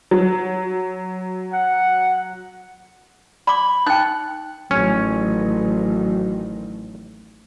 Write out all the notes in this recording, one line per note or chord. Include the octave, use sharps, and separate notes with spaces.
F#3
F#5
D5 B5 C6 D6
D#4 G5 F#6
A1 D#3 F#3 C#4